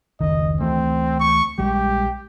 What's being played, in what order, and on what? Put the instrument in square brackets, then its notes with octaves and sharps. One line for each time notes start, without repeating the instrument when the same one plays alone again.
[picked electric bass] F1 C#2 D#3 [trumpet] D#5
[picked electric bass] D2 E3 A3 [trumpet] C4
[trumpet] C#6
[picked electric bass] A#1 G3 G#3 [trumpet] G4